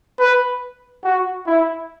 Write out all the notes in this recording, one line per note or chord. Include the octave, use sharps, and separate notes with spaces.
B4
F#4
E4